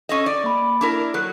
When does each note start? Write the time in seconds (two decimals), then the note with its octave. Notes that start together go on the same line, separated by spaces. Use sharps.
0.09 C#4 A4 D#5
0.26 D5
0.44 A#3 B5
0.81 D4 E4 A#4 D6
1.14 F#3 A4 F#6